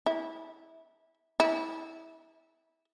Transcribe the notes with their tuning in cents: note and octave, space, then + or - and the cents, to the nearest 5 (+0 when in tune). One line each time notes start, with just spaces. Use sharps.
E4 -20
E4 -20